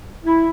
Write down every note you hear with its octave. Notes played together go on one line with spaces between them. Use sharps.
E4